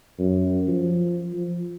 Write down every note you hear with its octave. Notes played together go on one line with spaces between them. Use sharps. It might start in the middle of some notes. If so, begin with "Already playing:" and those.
F#2
F3
F3